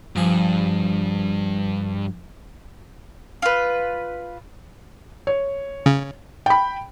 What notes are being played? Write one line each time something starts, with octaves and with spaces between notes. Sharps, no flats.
G2 F3 G#4
F4 B4
C#5
C#3
G5 B5